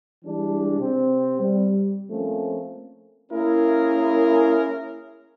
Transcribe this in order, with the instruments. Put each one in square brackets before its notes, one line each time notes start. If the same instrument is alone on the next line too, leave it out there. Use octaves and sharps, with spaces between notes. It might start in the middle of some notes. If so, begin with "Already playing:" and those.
[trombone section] E3 G3 G#3 D4
C3 C4
G3
F3 A3 A#3 C4 C#4
[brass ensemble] A#3 C#4 E4 G#4 A#4